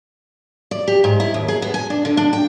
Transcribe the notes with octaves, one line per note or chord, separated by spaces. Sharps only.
D5
G4
G#2
E4
D#2
G#4
B3
G#5
D4
D3
D4
G5